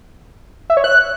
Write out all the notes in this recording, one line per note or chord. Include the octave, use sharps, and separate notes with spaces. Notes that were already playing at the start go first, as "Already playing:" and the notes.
E5
C#5
F#6